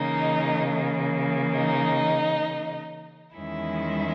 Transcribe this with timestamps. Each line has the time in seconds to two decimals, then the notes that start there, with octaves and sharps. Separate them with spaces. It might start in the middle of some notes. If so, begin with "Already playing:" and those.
Already playing: C#3 E3 A#3 D#4 D#5
1.54 D#4 D#5
3.36 E2 D#3 G#3 C#4 E4 E5